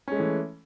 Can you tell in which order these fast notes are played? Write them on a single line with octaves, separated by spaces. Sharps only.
C#4 G#3 A3 E3